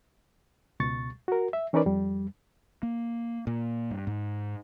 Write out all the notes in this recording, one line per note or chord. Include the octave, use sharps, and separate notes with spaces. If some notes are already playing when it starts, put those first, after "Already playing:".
C#2 B2 C#6 A6
F#4 A#4
E5
E3 C#4 D#4 A#4 B4 D5
F2 G3
A#3
A#2
G2
G#2